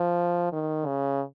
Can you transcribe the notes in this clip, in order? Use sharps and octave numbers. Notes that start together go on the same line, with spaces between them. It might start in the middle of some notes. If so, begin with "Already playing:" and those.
Already playing: F3
D#3
C#3